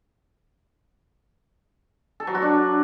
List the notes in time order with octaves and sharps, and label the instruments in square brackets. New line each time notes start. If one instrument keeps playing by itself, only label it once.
[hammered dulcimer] A4
F#3
F#4
D4